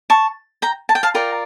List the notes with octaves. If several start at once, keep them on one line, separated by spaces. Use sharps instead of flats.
A5 C#6
G5 A#5
A5
G5
F5 A5
F4 A#4 D5 G5 A#5